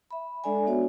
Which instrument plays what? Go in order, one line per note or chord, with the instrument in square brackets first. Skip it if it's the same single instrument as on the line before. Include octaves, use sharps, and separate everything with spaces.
[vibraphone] E5 B5
G#3 D4 A4 D5 E5 G#5
B3 D4 F#4 C#5